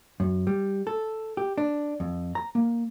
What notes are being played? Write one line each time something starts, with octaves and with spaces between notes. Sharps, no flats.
F#2
G3
A4
G4
D4
F2
A#5
A#3